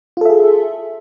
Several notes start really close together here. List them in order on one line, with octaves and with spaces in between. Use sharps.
F4 A4 E5 G#4